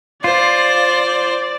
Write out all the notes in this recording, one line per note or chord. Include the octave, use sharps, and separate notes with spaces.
F4 C5 D5